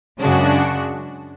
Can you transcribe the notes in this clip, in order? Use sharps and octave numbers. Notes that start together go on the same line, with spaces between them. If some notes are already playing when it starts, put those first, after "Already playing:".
F#2 C#3 G#3 D4 F#4